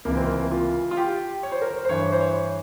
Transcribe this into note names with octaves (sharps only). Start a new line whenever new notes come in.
C#2 C3 E3 A#3
C4
A#3
F4
F4
G4
C#5
C5
A#4
C5
C5
G2 E3 C#5
C5
C#5